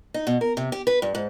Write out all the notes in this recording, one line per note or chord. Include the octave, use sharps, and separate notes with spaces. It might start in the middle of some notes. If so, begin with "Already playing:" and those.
D#4
B2
A#4
C3
G4
B4
G2
G#2